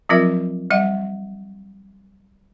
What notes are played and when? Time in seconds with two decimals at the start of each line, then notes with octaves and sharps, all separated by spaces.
0.09 F3 F#3 C4 F4 A#4 E5
0.70 G3 D#5 F#5